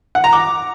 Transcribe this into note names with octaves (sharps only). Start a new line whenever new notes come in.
F#5
A#5
D6